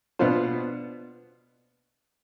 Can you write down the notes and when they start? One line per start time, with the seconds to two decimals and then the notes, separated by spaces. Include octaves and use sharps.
0.19 B2 B3 D4 F4 C5